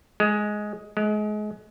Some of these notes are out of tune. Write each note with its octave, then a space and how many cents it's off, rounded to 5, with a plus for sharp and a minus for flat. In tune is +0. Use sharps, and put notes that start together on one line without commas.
G#3 +10
G#3 +30